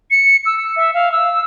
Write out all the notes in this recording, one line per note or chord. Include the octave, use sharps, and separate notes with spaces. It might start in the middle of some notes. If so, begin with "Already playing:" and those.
C#7
E6
E5
F5
E6